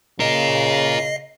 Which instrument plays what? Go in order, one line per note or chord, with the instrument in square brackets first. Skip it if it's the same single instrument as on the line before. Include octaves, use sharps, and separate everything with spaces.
[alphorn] C#3 [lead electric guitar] F4 A#4 [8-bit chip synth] D#5 C7